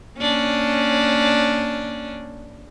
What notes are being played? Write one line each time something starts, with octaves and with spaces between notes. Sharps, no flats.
A#3 C#4 D4